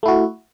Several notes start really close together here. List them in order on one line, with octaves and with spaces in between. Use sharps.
A3 E4 F#4